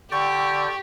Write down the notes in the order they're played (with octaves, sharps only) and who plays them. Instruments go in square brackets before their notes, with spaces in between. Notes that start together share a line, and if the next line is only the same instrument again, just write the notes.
[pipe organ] D3 D5 G5 [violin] G4 [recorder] C#6